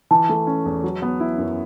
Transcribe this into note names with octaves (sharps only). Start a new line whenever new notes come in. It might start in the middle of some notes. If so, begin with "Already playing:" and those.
E3 A5
A3
C#4
E2
F#3
B3
E4
F#2